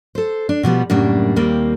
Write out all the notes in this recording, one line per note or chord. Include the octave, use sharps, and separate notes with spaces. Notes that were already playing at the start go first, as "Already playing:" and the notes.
A4 C5
D4
B2 F3 G3 B3
F#2 A2 C#3 G3 A#3 D4
D#2 G3 A#3 C4